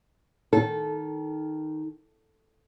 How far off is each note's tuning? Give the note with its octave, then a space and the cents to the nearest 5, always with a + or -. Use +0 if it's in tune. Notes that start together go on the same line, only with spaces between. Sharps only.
D#3 +0 A4 -20 G#5 -5